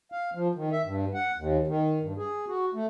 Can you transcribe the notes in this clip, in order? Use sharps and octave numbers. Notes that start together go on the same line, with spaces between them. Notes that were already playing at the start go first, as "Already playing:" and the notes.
F5
F3
D#3
E5
G2
F#5
D#2
D#3
G2
G#4
F#4
A3